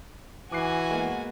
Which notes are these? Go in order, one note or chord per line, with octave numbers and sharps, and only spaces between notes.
E3 F#4 G#5 D6 F#6 C7
G#3 A#3 B3